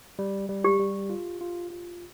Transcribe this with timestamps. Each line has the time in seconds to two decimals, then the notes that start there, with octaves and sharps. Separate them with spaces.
0.19 G3
0.49 G3
0.64 G4
0.80 G3
1.10 F4
1.41 F4
1.70 F4